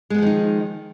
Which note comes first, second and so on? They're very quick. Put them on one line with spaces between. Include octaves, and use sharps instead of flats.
G#3 B3 F3 D#3 D#4